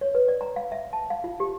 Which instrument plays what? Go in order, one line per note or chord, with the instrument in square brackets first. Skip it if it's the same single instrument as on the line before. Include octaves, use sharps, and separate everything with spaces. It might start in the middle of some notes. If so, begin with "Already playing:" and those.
[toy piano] C#5
B4
D5
A#5
F5
E5
A5
F5
F4
G4